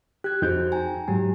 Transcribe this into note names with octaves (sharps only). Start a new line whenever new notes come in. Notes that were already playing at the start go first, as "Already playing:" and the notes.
G4 F#6 G#6
F2 D#4 F#4 G#4 C5 G6
G5 G#5 A#5
G#2 F#3 G4 G#5